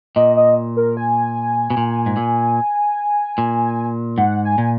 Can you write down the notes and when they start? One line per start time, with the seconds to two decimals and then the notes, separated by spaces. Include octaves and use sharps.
0.16 A#2 D#5
0.36 D#5
0.77 A#4
0.97 G#5
1.70 B2
1.77 A#2
2.06 G#2
2.17 A#2
3.38 A#2
4.17 G#2 F#5
4.45 G#5
4.58 A#2